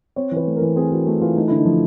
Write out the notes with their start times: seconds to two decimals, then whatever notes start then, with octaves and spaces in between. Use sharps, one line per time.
0.16 C4 C#5
0.31 E3
0.37 B4
0.46 A3
0.57 E3 A#4
0.76 C4 G#4
0.92 E3 F#4
1.06 A3 F#4
1.21 E3 F4
1.36 A3 D#4
1.48 D3 E4
1.56 D#4
1.66 F3